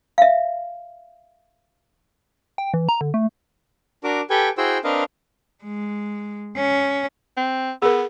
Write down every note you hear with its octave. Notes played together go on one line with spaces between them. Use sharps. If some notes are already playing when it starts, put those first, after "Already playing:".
E5 F5
G5
E3
A#5
D3
A3
D4 F#4 A#4 D6
G4 A4 B4 G5 G#5
E4 F#4 G#4 C5 G5 E6
C4 D4 A#4 B4 D#5 F5
G#3
C#4
C4
B3 G#4 A#4